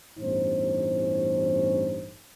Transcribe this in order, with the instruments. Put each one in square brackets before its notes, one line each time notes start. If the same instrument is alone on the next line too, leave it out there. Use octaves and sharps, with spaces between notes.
[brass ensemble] A1 E2 G2 C#4 D#4 C5